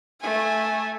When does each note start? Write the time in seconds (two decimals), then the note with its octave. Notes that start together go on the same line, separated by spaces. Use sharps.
0.21 A3 G#5